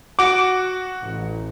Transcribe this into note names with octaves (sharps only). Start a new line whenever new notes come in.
F#4 F#5 D6
A1